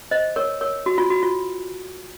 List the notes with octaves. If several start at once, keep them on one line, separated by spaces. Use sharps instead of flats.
C5 D#5
A#4 C#5
A#4 C#5
F#4
F4
F#4
F4